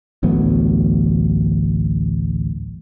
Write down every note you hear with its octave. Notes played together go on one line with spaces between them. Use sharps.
A1 D2 F#3 B3